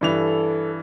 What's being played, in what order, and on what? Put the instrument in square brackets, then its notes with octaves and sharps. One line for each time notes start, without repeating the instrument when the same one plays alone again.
[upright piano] G2 E3 F7 [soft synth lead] A4